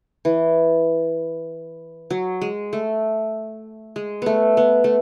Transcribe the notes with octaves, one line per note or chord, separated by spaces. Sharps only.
E3
F#3
G#3
A3
G#3
A3 B3
B3
A3